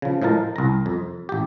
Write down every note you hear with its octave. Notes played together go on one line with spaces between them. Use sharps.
C#3 F3
A2 F3 G#3 A#4 A5
C2 A#5
F2
A1 G4